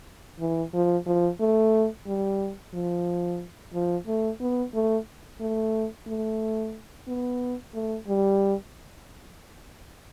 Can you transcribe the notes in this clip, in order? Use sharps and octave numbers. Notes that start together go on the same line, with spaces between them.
E3
F3
F3
A3
G3
F3
F3
A3
B3
A3
A3
A3
B3
A3
G3